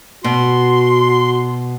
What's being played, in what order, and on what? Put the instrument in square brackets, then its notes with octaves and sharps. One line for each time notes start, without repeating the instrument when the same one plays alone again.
[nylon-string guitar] B2 [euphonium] F#4 [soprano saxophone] C6